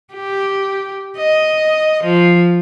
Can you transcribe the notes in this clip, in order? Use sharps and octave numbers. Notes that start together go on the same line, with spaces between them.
G4
D#5
F3